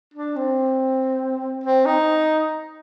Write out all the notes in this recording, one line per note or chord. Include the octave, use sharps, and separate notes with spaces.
D4
C4
C4
D#4